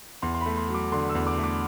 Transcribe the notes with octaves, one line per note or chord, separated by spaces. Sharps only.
E2 C6
C6
B5
A3
C6
F#3
D6
D3 C6
E6
E2
D6
A3
D6